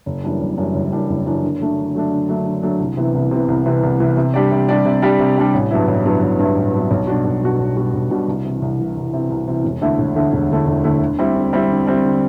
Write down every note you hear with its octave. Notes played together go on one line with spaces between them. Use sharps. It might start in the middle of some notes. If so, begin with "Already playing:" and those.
F#1
F#2 E3 G3 D4
F#1
F#2 E3 G3 D4
F#1
F#2 E3 G3 D4
F#1
F#2 E3 G3 D4
D3
F#3 A3 D4
D3
F#3 A3 D4
D3
F#3 A3 D4
D3
F#3 A3 D4
C2
C3 E3 B3
C2
C3 E3 B3
C2
C3 E3 B3
C2
C3 E3 B3
C3
G3 D4 G4 D5
C3
G3 D4 G4 D5
C3
G3 D4 G4 D5
C3
G3 D4 G4 D5
A1
G2 F#3 B3 E4
A1
G2 F#3 B3 E4
A1
G2 F#3 B3 E4
A1
G2 F#3 B3 E4
B1
B2 G3 D4 F#4
B1
B2 G3 D4 F#4
B1
B2 G3 D4 F#4
B1
B2 G3 D4 F#4
C2
C3 E3
C2
C3 E3
C2
C3 E3
C2
C3 E3
E1
D2 D3 A3 E4
E1
D2 D3 A3 E4
E1
D2 D3 A3 E4
E1
D2 D3 A3 E4
D3
G3 C4 E4
D3
G3 C4 E4
D3
G3 C4 E4
D3